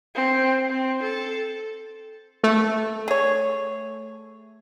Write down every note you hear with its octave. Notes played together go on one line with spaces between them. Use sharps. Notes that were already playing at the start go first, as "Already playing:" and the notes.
C4
C4
A4
A3
G#4 C#5